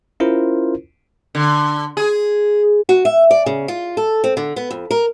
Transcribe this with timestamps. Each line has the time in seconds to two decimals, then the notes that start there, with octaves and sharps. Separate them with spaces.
0.20 C#4 E4 F4 A#4 C5
1.35 D3
1.97 G#4
2.89 F#4
3.05 E5
3.31 D5
3.46 C#3
3.68 F4
3.97 A4
4.24 C4
4.37 D3
4.56 B3
4.71 F2
4.91 A#4